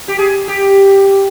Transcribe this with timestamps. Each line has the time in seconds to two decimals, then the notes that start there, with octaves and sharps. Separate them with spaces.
0.08 G4
0.18 G#4
0.48 G4